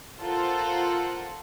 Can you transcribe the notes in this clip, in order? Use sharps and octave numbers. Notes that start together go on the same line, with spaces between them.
F4 A4 A#4 C5 F#5